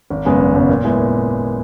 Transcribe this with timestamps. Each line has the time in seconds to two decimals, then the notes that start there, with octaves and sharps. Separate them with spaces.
0.10 G#1
0.25 F#2 C#3 G#3 B3
0.39 G#1
0.55 F#2 C#3 G#3 B3
0.69 A#2
0.84 G#3 B3 E4
0.98 A#2